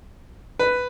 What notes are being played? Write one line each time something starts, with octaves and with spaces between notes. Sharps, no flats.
B4